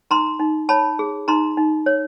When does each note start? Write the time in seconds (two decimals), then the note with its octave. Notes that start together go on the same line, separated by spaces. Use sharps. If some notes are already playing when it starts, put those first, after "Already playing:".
0.11 D#4 A#5 C6
0.39 D#4
0.69 C#5 A5 B5
0.99 G#4
1.28 D#4 A#5 C6
1.57 D#4
1.86 C#5